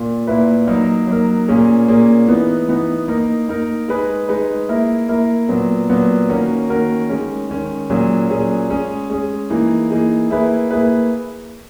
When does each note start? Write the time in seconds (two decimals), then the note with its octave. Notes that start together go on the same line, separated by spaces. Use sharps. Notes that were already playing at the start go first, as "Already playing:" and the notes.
Already playing: A#2
0.27 A#2 A#3 E4 B4
0.67 F#3 A#3 D#4 A#4
1.07 F#3 A#3 D#4 A#4
1.48 A#2 A#3 C#4 G#4
1.88 A#2 A#3 C#4 G#4
2.28 E3 B3 D#4
2.68 E3 B3 D#4
3.08 A#3 D#4 A#4
3.48 A#3 D#4 A#4
3.88 G#3 D#4 G#4 B4
4.29 G#3 D#4 G#4 B4
4.69 A#3 E4 A#4
5.09 A#3 E4 A#4
5.49 A#2 F#3 B3
5.89 A#2 F#3 B3
6.29 D#3 A#3 C#4 F#4 A#4
6.69 D#3 A#3 C#4 F#4 A#4
7.09 D#3 G#3 C#4
7.50 D#3 G#3 C#4
7.90 A#2 F#3 C#4 G#4
8.30 A#2 F#3 C#4 G#4
8.70 G#3 C#4 G#4
9.10 G#3 C#4 G#4
9.50 E3 A#3 D#4 G#4
9.91 E3 A#3 D#4 G#4
10.30 A#3 E4 G#4 B4
10.71 A#3 E4 G#4 B4